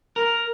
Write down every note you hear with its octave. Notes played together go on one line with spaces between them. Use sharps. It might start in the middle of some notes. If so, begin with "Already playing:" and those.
A#4